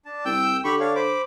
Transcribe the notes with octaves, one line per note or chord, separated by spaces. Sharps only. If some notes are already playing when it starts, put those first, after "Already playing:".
D4 A5
C2 G5 E6 G6
D3 G4 B5 C#6
D4 C#5 F5
C5 B5 D6